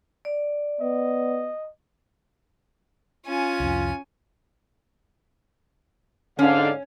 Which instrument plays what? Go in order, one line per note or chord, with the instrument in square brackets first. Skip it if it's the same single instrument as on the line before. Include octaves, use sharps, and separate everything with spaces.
[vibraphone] D5
[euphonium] B3 [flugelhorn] D#5
[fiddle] C#4 G#5 [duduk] F4
[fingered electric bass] C2 F2
[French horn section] G#2 D3 [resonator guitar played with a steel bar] C#4 [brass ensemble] D5 F5